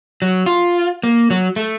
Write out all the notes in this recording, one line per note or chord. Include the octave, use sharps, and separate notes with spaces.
F#3
F4
A#3
F#3
A3